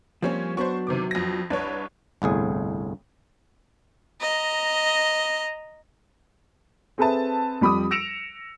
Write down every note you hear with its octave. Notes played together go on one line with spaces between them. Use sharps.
F3 G3 A#3 C4 C#4
F#3 B3 D4 C5 C#6
C3 D#3 D6
F2 A#6
C2 D4 B4 C#5
G1 C2 A2 G#4
D#5 A#5
C4 G#4 A4 B4 E5 A5
F2 G3 B5 D6 D#6
E6 A#6 C#7 D7 E7 F7